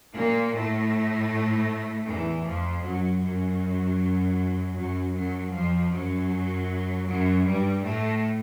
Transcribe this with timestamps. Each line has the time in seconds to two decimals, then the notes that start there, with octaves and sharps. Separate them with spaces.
0.14 A#2 A#3
0.53 A2 A3
2.06 E2 E3
2.45 F2 F3
2.83 F#2 F#3
3.22 F#2 F#3
4.75 F#2 F#3
5.14 F#2 F#3
5.53 F2 F3
5.91 F#2 F#3
7.06 F#2 F#3
7.45 G2 G3
7.83 A2 A3